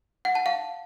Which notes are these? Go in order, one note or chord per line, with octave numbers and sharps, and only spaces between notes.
F#5
A5
F5